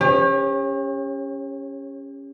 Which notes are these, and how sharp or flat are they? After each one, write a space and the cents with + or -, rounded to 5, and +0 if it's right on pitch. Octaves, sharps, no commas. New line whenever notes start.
C#4 +0 G4 +40 C#5 -30